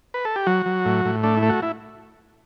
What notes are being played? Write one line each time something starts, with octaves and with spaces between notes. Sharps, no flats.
B4
A4
G4
F#3 F#4
F#3
A2
A2
A3 D4
E4
A3
F#4
E4